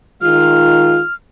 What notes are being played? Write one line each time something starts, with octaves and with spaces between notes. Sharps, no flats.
D#3 G#3 F4 F6